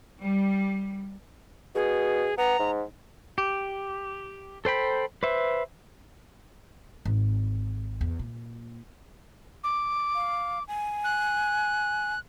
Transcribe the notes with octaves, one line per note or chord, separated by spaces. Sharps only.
G3
B2 G#4
B3 A#5
G#2
G4
A4 C5 G5 B5
B4 C5 E5
G#1
E2
A#2
D6
F5
G#5
F#6